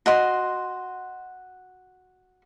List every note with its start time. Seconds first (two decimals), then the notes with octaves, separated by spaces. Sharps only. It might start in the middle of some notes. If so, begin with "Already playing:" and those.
0.06 F#4 D#5 C6